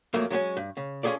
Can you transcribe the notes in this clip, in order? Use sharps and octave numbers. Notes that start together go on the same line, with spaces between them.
F2 F#3 A3 A#3
F#3 G#3 C4 C#4
G2
C#3
C#4 F4 G#4 A4 D5